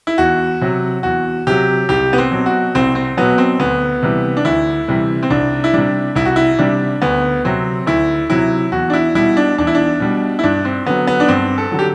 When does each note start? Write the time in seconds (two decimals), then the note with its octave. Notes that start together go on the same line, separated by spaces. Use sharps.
0.07 E4
0.18 E2 F#4
0.61 C3 F#3
1.03 E2 F#4
1.47 C3 F#3 G4
1.89 C2 G4
2.13 B3
2.18 C4
2.31 B2 F#3
2.46 F#4
2.75 C2 C4
2.95 C4
3.17 B2 F#3 B3
3.38 C4
3.59 D2 B3
4.03 C3 E3 G3
4.37 D4
4.45 D2 E4
4.88 C3 E3 G3
5.23 C4
5.30 C2 D4
5.64 E4
5.74 C3 G3 D4
6.16 C2 E4
6.25 F#4
6.36 E4
6.59 C3 G3 D4
7.02 D2 B3
7.45 C3 F#3 C4
7.87 D2 E4
8.30 C3 F#3 E4
8.72 E2 F#4
8.90 D4
8.93 E4
9.15 B2 G3 E4
9.37 D4
9.58 E2 D4
9.67 E4
9.75 D4
10.00 B2 G3
10.39 E4
10.43 G2 D4
10.65 C4
10.86 D3 F#3 B3
11.07 B3
11.20 D4
11.28 G2 C4
11.58 A4
11.71 D3 F#3
11.79 G4